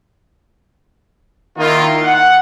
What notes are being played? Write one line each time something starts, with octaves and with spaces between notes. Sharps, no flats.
D#3 A#3 E4 F4
F#5